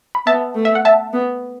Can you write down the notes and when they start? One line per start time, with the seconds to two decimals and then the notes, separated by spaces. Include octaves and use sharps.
0.15 B5
0.26 B3 E5 A5
0.56 A3
0.65 E5
0.75 F#5
0.85 E5 A5
1.14 B3